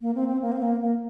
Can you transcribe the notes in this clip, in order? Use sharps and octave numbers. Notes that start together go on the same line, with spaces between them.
A#3
C4
C4
A#3
C4
A#3
A#3